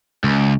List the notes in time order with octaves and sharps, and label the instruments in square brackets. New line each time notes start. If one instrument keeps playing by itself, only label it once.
[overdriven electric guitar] C#2